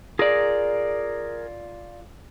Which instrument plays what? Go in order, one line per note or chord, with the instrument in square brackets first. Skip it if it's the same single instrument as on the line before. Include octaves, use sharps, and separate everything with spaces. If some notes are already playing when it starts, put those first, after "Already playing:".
[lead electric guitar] F4 D5 [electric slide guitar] G#4 A#4